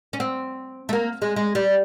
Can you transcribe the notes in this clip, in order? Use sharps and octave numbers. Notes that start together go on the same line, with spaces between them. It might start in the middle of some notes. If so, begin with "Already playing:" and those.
C#4
C4
A3
A#3
G#3
G#3
G3